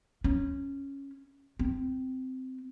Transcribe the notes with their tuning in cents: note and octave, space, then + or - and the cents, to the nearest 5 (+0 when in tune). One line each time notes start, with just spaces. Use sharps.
C#4 -5
C4 -15